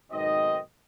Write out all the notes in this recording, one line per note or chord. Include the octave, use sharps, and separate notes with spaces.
B1 G#2 B2 D#3 C4 D#5